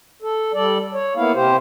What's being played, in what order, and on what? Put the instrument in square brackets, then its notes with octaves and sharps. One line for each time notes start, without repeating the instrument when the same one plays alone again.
[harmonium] A4
G3 A4 D5
C#5
A#3 B3 E4 F5
C3 G4 C5